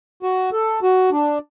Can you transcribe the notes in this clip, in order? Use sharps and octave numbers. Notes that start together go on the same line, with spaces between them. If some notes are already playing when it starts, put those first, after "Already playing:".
F#4
A4
F#4
D4